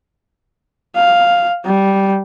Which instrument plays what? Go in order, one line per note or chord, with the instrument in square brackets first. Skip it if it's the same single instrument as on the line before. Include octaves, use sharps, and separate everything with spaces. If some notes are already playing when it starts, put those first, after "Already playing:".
[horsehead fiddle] F5
G3